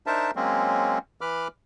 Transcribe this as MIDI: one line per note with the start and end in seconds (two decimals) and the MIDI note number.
0.06 0.31 62
0.06 0.31 63
0.06 0.31 70
0.06 0.31 72
0.06 0.31 76
0.06 0.31 81
0.36 0.99 54
0.36 0.99 56
0.36 0.99 58
0.36 0.99 60
0.36 0.99 61
1.21 1.48 52
1.21 1.48 71
1.21 1.48 83
1.21 1.48 86
1.21 1.48 89